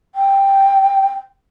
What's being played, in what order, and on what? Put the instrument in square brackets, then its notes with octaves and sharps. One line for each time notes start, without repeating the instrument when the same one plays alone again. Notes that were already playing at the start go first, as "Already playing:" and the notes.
[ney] G5